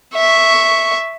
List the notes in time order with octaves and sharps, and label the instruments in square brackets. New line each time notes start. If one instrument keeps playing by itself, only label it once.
[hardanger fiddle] E5 C#6